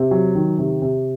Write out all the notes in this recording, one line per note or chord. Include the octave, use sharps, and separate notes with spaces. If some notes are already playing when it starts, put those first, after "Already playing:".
Already playing: C3
F#3
D#3
C3
C3